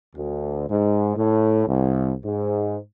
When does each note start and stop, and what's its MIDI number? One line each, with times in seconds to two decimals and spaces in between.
0.16 0.67 38
0.68 1.16 44
1.17 1.65 45
1.67 2.13 36
2.25 2.77 44